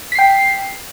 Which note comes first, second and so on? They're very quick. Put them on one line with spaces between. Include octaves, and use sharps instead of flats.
B6 C7 G5